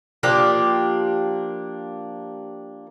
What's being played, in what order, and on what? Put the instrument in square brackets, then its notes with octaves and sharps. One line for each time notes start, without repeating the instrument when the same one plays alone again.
[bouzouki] F3 A#3 D4 G4